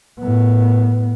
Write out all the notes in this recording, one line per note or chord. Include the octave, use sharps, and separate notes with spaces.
A2 B3